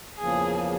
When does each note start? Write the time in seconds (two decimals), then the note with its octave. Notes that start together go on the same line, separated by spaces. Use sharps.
0.18 E2 C#3 F3 A#3 G#4